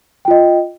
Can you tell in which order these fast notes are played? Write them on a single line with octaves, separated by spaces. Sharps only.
G5 F4 D#5